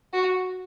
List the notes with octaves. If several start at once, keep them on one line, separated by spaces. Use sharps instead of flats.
F#4